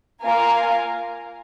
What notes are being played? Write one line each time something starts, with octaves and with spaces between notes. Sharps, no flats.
A#3 F4 A#4 F5 G#5